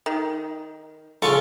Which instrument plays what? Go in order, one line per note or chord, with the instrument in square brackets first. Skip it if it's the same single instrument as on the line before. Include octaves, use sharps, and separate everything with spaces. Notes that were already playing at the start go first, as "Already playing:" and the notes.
[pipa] D#3
[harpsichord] C#3 F4 C#6 [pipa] A4